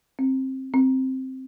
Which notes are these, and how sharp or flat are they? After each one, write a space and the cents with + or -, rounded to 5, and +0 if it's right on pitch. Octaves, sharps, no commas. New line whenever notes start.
C4 +15
C4 +5